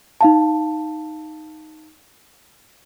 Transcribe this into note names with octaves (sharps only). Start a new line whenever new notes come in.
D#4 F5 A5